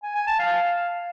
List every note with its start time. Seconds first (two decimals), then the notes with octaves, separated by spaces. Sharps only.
0.03 G#5
0.15 G#5
0.27 A5
0.39 F5